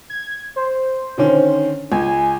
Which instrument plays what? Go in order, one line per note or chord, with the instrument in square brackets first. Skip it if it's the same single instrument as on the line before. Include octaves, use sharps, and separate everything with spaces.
[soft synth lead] G#6
C5
[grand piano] D3 D#3 C#4
[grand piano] C#2 [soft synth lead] G#5